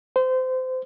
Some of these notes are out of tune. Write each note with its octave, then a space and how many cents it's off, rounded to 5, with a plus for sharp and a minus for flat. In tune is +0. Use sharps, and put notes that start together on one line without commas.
C5 -25